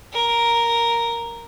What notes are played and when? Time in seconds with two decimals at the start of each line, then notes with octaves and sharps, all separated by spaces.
0.13 A#4